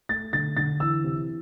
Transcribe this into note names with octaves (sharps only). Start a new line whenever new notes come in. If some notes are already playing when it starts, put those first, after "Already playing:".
A3 A6
D3 A6
D3 A6
E3 E6
C3